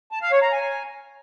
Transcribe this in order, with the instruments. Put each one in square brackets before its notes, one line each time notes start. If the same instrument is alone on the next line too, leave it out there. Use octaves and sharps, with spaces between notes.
[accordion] A5
F5
C#5
A#5
G#5